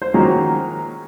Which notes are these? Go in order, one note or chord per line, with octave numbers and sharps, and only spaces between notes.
C5
D#3 F3 F#3 G#3 A#3 C#4